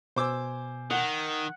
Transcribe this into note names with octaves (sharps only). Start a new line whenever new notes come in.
B2 C5 G#5 D6 E6
D#3 F#5